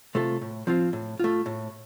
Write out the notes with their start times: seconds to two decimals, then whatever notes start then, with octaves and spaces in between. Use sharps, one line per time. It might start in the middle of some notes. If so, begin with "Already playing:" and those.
0.15 C3 A3 F4 A4
0.41 A2
0.67 F3 C4 F4
0.93 A2
1.20 A3 F4
1.46 A2